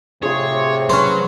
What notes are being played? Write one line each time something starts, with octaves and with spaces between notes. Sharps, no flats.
A2 C3 F4 G#4 C#5
F#3 C#4 B4 C5